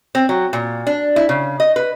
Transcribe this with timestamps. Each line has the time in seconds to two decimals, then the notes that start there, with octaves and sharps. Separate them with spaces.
0.15 C4
0.29 F#3
0.53 A#2
0.87 D4
1.16 E4
1.29 C#3
1.60 D#5
1.76 B4